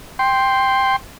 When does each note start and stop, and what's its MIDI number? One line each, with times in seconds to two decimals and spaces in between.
0.19 0.96 79
0.19 0.96 84